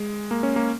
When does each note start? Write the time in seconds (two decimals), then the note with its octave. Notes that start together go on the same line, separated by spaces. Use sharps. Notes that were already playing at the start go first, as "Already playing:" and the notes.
Already playing: G#3
0.31 A#3
0.43 C#4
0.56 A#3